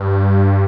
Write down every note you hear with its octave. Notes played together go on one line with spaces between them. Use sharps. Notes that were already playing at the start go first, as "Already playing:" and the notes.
Already playing: G2